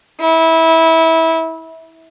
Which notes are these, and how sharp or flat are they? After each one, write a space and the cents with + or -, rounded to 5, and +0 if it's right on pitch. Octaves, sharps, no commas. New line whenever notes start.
E4 -20